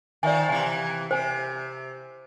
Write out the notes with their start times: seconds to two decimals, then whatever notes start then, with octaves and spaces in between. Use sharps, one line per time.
0.23 D#3 F3 D5 E5 G#5
0.49 C3 E3 G#5
1.11 C3 C5 G#5